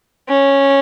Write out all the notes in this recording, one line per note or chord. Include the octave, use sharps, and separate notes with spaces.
C#4